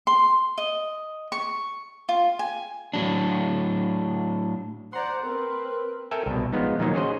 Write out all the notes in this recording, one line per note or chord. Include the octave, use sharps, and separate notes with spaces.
C6
D#5
C#6
F4
G#5
A2 F#3 D4
C5 D5 F#5 A#5 C6
C4 A#4 B4
A#4
A4 A#4 E5 G5 G#5
C2 B2
F3 G#3 B3 D#4
A#2 D#3 F3 F#3 A#3 D#4
C#4 F#4 G#4 C5 D#5